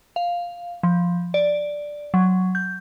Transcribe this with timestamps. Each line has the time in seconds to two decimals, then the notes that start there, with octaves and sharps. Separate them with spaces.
0.16 F5
0.83 F3
1.34 D5
2.14 F#3
2.55 G6